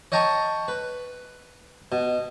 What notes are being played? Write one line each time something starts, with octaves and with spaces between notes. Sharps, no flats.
C#5 D#5 G5 A5 A#5 C#6
B4
B2